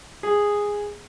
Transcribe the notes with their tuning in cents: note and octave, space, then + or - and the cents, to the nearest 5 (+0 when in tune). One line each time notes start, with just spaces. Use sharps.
G#4 -10